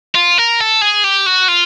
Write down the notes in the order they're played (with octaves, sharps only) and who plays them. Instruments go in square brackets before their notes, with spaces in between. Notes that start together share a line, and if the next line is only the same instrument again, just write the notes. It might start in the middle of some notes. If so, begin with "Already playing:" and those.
[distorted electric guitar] F4
A#4
A4
G#4
G4
F#4
F4